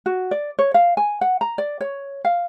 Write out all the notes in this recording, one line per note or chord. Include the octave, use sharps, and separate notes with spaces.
F#4
D5
C#5
F5
G#5
F#5
A#5
D5
C#5
F5